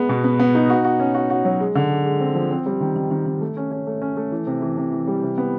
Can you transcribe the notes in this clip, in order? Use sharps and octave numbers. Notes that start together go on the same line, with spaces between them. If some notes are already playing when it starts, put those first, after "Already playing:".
Already playing: G#3 B3
B2
B3
B3
D#4
F#4
F#4
C#4
F#4
F#4
F#3
G#3
D3
G#3
G#3
C4
F3
C4
G3
D#3
D#3
D#3
D#3
A3
C#4
C#4
A3
C#4
A3
E3
C3
E3
C3
E3
G3
C3
B3